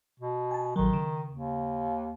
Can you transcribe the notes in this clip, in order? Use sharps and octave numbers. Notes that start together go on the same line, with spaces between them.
B2
G#5 A5
A1 D#3 F#3
C#3
D#2